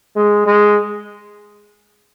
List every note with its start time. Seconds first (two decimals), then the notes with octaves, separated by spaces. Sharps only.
0.16 G#3
0.46 G#3